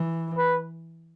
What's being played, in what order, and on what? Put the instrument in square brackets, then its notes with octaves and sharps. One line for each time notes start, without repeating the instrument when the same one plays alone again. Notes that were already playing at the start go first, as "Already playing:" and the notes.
Already playing: [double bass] E3
[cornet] B4